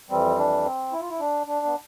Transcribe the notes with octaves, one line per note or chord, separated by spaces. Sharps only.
F2 E3 G3 C4
D4
C4
E4
F4
E4
D4
D4
B3